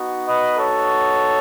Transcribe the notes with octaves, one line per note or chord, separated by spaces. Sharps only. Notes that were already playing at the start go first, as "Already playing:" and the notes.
Already playing: B3 D#4 F#4
B4 D#5
A4 C#5